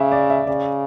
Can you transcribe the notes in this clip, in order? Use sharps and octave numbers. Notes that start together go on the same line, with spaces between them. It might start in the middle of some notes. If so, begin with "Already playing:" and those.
Already playing: C#3 E5
D5
E5
C#3 D5